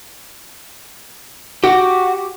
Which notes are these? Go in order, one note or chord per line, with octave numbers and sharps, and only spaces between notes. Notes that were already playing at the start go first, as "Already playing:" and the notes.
F#4 G4 D6